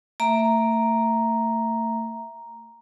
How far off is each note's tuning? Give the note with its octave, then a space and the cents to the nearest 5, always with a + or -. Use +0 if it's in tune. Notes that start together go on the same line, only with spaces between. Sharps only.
A3 +35 E5 +0 A#5 +0